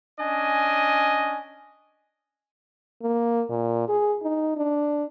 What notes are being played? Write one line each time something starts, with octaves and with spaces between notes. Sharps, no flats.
C#4 D4 D#5 G#5
A#3
A#2
G#4
D#4
D4